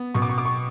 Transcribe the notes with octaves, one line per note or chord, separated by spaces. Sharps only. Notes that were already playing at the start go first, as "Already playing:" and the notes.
Already playing: B3
B2 C#6
D6
C#6
D6
C#6